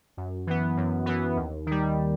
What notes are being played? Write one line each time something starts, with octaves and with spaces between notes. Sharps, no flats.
F#2
E3 B3
F#2
E3 B3
D#2
D#3 G3